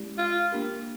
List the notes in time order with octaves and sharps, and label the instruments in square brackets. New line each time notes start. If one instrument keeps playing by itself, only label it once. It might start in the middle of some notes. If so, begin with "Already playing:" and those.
Already playing: [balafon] G#3 C#4 E4 G4
[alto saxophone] F4
[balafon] A#3 D4 G4 A#4